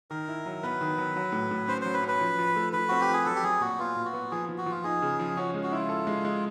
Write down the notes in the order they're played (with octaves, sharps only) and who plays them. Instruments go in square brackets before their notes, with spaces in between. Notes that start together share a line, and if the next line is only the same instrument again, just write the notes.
[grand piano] D#3 [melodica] A#4
[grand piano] E4
F#3
[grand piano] B3 [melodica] B4
[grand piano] D#3
F#3
F#3
A2
A2
[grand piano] C#4 [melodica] C5
[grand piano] F#3 [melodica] C5
[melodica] B4
[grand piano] C#4
[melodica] B4
[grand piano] F3
F3
A3
[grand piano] F3 [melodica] B4
[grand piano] C4 [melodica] F#4
[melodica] G4
[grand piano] F3 [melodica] G#4
[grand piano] F#3 [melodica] A4
[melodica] G4
[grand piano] F#3 [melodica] G#4
[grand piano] A#2 [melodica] F#4
[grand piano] B3 [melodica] F4
[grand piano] A#2
[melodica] F#4
[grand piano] B3
[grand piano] F3 [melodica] G#4
[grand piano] F3
[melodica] F#4
[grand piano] F3 [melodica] F4
[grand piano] D#4 [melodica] G#4
[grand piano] C#3
F3
[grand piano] C#4 [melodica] F#4
[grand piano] G#3
[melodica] F#4
[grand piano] E4 [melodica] F4
[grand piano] A4
G#3
G#3